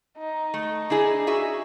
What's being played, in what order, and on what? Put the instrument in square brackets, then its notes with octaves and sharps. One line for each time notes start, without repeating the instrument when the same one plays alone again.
[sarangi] D#4
[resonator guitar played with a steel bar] A3
D4 E4 G#4
F#4 G#4 E5